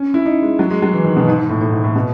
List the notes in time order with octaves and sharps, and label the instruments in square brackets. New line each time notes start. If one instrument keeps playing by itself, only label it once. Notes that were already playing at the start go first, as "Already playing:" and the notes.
Already playing: [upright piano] C#4
E4
D#4
G#3
F#3
G#3
F#3
E3
D#3
B2
G#2
G#2
A2
A2
G#2
A2
B2